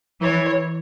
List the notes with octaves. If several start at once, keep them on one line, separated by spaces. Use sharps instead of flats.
E3 C#5